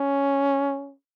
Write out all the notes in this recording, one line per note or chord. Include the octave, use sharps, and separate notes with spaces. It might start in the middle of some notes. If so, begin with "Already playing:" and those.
Already playing: C#4